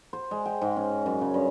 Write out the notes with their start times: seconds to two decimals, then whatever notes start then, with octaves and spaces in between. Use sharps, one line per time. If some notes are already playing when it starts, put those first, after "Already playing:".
0.13 C5
0.31 G#3
0.46 G5
0.62 G#2
0.76 C#4
1.06 F#2
1.21 C#3
1.34 G2